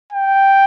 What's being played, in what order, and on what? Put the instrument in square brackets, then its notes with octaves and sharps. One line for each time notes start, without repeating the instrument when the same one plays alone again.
[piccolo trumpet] G5